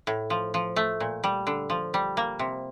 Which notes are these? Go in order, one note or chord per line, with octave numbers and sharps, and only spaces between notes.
A2
F3
F3
A3
A#2
G3
D3
F3
G3
A#3
C3